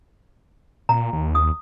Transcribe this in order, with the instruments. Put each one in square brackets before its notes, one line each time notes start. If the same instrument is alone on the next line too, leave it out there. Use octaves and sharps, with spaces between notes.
[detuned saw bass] A#2 [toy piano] A#5
[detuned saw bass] D#2
[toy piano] D#6